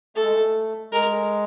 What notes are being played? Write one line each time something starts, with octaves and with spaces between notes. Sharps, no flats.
A3 A4
G#3
A3
G#3 A#4